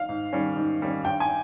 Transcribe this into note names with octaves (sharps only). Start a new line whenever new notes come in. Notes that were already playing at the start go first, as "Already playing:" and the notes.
Already playing: F5
G#2
D#3 G3 C#4
G#2
D#3 G3 C#4
G2 G5
G#5